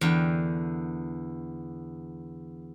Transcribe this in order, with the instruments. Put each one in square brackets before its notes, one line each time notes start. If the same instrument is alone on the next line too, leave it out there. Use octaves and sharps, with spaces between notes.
[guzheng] E2 D3 G5